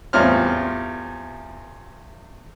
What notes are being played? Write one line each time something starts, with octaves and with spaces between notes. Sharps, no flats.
E2 A2 G3 C4 F4 F6